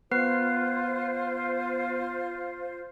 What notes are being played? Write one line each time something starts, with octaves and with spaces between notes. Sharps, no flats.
B3 F4 B4 C5 C7